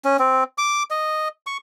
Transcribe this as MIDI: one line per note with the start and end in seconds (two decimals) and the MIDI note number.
0.05 0.17 61
0.19 0.44 60
0.58 0.83 86
0.91 1.28 75
1.47 1.57 85